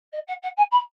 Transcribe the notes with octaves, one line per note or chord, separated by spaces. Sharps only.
D#5
F#5
F#5
G#5
B5